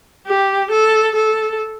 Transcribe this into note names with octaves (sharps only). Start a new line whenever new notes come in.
G4
A4
A4